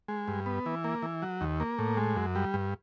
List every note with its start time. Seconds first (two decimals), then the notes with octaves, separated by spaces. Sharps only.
0.08 G#3
0.28 G2
0.46 B3
0.66 E3
0.84 A#3
1.02 E3
1.22 F#3
1.41 D#2
1.60 A#3
1.79 A2
1.97 G#3
2.16 F#2
2.35 G3
2.54 G2